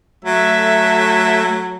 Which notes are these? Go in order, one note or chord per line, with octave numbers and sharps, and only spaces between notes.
F#3 A3 E5